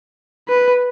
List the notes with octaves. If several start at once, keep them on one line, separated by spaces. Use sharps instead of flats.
B4